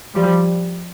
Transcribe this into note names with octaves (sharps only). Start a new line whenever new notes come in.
F3 G3